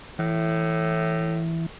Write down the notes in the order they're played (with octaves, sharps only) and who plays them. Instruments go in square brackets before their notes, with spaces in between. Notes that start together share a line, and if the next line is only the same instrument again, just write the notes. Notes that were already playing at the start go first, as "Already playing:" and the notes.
[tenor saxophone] A2 [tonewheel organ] E3